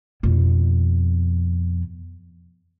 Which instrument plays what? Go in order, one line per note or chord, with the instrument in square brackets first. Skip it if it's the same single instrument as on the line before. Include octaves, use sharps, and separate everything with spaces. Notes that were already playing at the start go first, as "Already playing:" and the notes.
[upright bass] F2 B2